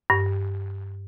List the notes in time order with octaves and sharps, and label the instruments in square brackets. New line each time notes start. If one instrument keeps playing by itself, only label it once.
[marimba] G2